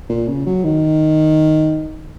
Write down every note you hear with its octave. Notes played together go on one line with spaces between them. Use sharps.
A#2
C#3
F#3
D#3